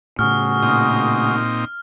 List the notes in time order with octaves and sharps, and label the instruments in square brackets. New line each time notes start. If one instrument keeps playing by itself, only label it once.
[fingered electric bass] A2 C#3 [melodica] F#4 G#4 [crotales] F6
[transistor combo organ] A#2 C4 D#4